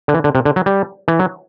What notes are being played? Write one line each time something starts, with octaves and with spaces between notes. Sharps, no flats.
D3
E3
D3
C3
D3
F#3
G3
E3
F#3